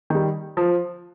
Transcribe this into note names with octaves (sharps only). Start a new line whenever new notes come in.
D#3 G3
F3